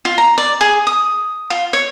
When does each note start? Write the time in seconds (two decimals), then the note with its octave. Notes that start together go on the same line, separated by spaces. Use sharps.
0.05 F4
0.18 A#5
0.38 D5
0.61 G#4
0.87 D#6
1.50 F4
1.73 C#5